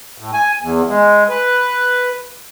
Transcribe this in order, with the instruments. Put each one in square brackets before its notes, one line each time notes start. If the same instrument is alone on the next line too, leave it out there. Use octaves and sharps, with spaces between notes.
[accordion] A2
G#5
E2
G#3
B4